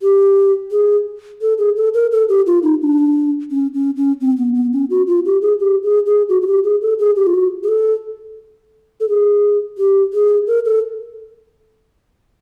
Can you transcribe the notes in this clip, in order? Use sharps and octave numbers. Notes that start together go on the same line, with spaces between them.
G4
G#4
A4
G#4
A4
A#4
A4
G4
F4
D#4
D4
C#4
C#4
C#4
C4
B3
B3
C#4
F#4
F4
G4
G#4
G4
G#4
G#4
F#4
F#4
G4
G#4
A4
G#4
G4
F4
F#4
G#4
A4
A4
G#4
G4
G#4
A#4
A4